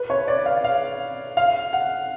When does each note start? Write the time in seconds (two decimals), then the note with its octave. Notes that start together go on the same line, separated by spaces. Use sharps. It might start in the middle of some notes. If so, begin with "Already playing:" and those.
Already playing: B4
0.10 C#5
0.28 D5
0.46 F5
0.64 F5
1.37 F5
1.73 F#5